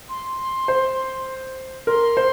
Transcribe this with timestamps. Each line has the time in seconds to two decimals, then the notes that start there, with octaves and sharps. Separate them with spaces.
0.09 C6
0.68 C5
1.87 A#4 C6
2.17 C5